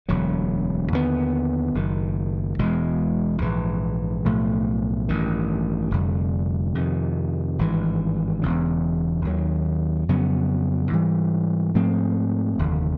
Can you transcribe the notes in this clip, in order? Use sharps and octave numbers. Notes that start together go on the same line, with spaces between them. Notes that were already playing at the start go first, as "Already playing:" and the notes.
E1 D2 D3 F#3
D#2 D3 G3 B3
F#1 F#2 D#3
E1 E2 B2 G#3
A#1 G#2 E3
B1 A2 F3 A3
A1 G2 D#3
F1 F2 D3 G3
F2 C3 D#3
G#1 G2 E3
E1 E2 C#3
D#2 D#3 F#3
F2 C#3 F#3 B3
G#2 E3 G3
G#2 F3 A3 C4
F1 D#2 D3